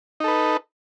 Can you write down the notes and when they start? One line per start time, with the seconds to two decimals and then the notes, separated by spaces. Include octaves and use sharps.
0.20 D#4
0.24 A4
0.28 B4